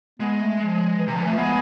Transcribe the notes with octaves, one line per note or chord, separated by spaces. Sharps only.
G#3 B3
A3
F3
E3
C3
D3 F3
E3 A3
F3
G#3 B3